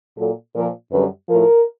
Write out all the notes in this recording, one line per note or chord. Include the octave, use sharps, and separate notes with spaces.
A#2 F#3 A4
A#2 F3 A#4
F#2 D3 G3 B4
A2 F3 A#4